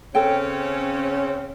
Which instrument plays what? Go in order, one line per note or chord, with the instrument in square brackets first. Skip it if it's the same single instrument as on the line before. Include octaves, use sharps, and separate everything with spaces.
[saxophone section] C#3 C4 C#4 [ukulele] A4 G5